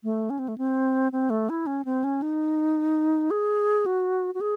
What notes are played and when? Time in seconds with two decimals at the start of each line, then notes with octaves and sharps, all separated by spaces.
0.04 A3
0.30 C#4
0.39 C4
0.48 A3
0.58 C4
1.12 C4
1.30 A3
1.49 E4
1.67 C#4
1.85 C4
2.04 C#4
2.22 D#4
3.31 G#4
3.86 F#4
4.35 F#4
4.41 G#4